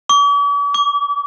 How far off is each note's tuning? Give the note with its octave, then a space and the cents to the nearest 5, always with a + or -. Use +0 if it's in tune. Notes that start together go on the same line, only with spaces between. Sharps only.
D6 -45
D6 -25